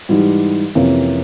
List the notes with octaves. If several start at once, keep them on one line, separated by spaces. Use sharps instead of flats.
G#2 E3 G3
F2 C3 E3 A#3 C#4